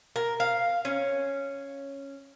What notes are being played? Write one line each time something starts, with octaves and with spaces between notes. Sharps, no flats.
A#4
F5
C#4